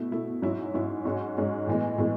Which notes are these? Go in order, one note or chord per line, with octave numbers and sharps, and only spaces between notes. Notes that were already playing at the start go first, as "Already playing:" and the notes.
Already playing: B2 A3 E4
B2 A3 E4
G#2 F#3 C#4 E4
G#2 F#3 C#4 E4
G#2 G#3 C#4 F#4
G#2 G#3 C#4 F#4
A2 E3 G#3 B3
A2 E3 G#3 B3